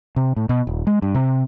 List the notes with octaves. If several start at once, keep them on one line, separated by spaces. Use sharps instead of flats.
C3
A2
B2
D#1
G#3
G2
C3